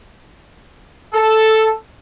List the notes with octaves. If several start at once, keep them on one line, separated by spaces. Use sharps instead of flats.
A4